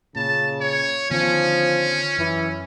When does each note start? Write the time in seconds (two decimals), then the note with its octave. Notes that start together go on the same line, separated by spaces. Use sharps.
0.15 A#2 C#3 A5
0.61 C#5
1.11 D3 D#3 F3 B3 C#4
2.18 F#2 E3